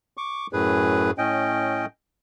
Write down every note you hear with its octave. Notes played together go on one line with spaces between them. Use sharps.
C#6 D6
F#2 A2 G#4 B4
A2 C#4 D#5 G5